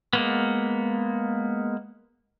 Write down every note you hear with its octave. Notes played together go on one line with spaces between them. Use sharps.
G#3 A#3 B3